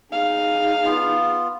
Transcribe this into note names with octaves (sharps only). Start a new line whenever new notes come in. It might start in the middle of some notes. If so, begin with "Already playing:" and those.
D#4 G#4 F5
B3 F4